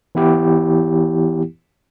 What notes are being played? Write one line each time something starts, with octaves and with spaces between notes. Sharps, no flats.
E3 B3 E4 G4